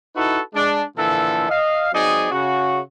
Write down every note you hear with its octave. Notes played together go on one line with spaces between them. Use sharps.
D#4 E4 F#4 A4 B4
G#3 D4
A#2 D3 E3 F3 A4
D#5 F5
F#3 C4 D#4 G#4 D5
C#3 F#4